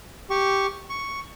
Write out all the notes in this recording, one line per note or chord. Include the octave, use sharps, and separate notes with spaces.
G4 C#6
C#6